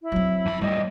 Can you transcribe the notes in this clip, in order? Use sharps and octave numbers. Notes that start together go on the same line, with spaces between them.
E4
F#3 C4
F2 B5
A2 G3 A#3 D#5